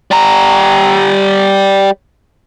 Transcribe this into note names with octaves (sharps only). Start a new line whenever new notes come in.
G3 A#5